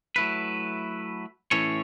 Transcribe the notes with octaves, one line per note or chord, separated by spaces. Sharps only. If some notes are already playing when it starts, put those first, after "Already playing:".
F#3 A3 E4 B4
A2 E3 C#4 A4 C#5